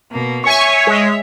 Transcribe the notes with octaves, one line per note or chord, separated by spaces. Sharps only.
B2 A#3
C#5 E5 G#5 C#6
G#3